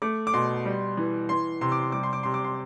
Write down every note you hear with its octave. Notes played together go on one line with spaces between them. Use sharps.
A3 D6
D6
B2 C6
G3
E3
E3 C6
C3 C6
D6
C6
G3 D6
C6
D6
C3 C6
D6
C6